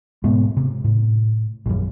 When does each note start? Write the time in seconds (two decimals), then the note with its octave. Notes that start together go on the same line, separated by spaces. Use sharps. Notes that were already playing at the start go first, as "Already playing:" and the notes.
0.24 G#2 B2 G#3 B3
0.57 C3
0.84 A2
1.66 A#1 F#2